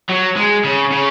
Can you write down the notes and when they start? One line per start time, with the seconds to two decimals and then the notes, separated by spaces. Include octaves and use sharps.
0.09 F#3
0.36 G#3
0.64 C#3
0.92 C#3